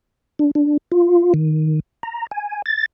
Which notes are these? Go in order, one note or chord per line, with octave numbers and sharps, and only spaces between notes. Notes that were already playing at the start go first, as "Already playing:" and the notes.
D4
D4
F4
D#3
A#5
G#5
A6